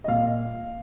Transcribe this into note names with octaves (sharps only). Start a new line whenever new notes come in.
D#5
A#2 F5